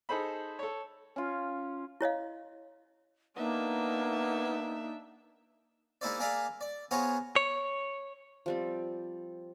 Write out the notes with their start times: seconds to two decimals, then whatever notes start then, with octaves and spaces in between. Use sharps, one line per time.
0.09 D#4 G#4 A4 C5 B5
0.59 A4 C#5
1.16 C#4 F4
2.01 E4 C#5 D#5 F5
3.37 A#3 B3 D4 D#4 E5
6.01 G#3 A#3 D#4 E4 C5 D5
6.20 A#3 G#4 A#4 D5 E5 F5
6.61 D5
6.91 B3 F4 G#4 C5 C#5 A#5
7.36 C#5
8.46 F3 G3 C4